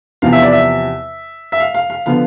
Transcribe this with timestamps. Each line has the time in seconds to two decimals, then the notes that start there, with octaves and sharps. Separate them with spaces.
0.22 E2 C3 F3 B3 F5
0.33 E5
0.42 D5
0.52 E5
1.52 E5
1.60 F5
1.75 F5
1.90 F5
2.06 D3 F3 B3 F5